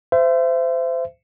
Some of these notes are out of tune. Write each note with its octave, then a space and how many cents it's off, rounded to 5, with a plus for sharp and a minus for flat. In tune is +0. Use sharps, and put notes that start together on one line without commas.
C5 -25 E5 +30